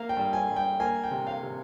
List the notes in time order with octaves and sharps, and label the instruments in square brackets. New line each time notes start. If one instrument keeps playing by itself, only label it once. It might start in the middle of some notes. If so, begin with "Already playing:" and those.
Already playing: [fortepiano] A#3 F5
G5
G2
G#5
G2
G5
A#3 G#5
G5
C3
F5
C3